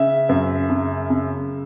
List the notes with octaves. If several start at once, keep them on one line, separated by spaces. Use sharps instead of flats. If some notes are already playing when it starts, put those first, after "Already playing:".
Already playing: C#3 E5
F#2
C#3
C#3